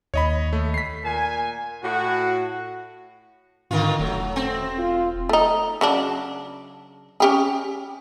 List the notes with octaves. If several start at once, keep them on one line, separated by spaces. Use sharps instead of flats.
D#2 C#5 D#5 B5
A3
B6 C7
A#2 A#4 G#5
A2 F#4
G#2 D3 D#3 F4
E1 F#3 A3
C4
F4
A3 D#4
C#3 F#3 D4
C#4 G4 G#4